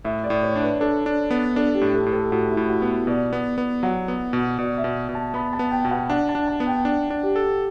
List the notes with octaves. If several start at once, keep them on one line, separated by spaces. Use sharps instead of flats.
A2 E5
D5
A2
C#5
D4
B4
D4 A4
D4
B3
D4 A4
G4
A2
A4
A2
A4
A2 F#4
E4
A2
F#4
B3
B2 D5
B3
B3
F#3 F#5
B3
B2
B2 D5
E5
B2
B2
A5
B3 B5
A5
B3
G5
B2
F#5
D4 F#5
A5
D4
A5
B3
G5
D4
D4
G4
A4